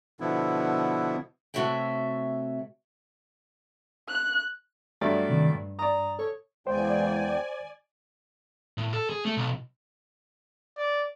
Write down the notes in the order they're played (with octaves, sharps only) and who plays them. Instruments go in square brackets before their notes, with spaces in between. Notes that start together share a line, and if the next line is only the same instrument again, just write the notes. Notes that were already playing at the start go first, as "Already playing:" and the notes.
[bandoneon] B2 D3 F3 B3 E4
[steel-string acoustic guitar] C3 A3 F#4 C#5 E5 G5
[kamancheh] F#6
[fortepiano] G2 F#3 A3 [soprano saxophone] D5
[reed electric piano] C3 D#3
G2
[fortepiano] D5 D#6 [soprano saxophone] A#5
[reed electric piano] A4 [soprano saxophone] C#5
[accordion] E2 G5 [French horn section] C#3 E3 G#3 [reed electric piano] C5 [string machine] D5 G#5
[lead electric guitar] A2
A4
G#4
A3
B1
[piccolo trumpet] D5